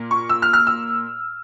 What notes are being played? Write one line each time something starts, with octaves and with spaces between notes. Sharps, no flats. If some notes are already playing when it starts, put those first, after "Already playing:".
Already playing: A#2 A#3
C#6
E6
F6
F6
E6